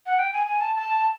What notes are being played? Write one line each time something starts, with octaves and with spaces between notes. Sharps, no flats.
F#5
G5
G#5
G#5
A5
A5